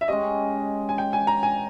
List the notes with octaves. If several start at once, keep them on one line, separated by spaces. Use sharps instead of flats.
E5
G#3 C#4 G4 D#5
G#5
G5
G#5
A#5
G#5